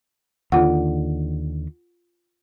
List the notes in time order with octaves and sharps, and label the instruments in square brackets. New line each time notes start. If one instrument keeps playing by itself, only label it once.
[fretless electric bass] D#2 D3 [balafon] F4 F#5